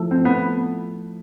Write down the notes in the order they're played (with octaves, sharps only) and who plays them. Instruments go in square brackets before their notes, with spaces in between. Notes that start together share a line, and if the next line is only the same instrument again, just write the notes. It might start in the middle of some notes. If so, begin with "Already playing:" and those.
Already playing: [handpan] F3 A3 E4 A4
[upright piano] C4
B3